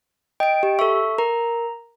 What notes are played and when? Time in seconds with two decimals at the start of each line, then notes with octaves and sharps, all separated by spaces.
0.40 D#5 G5 D7
0.63 G4
0.79 A4 E5 C#6
1.18 A#4 A#5